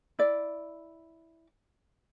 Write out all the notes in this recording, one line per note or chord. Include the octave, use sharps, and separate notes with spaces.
E4 D5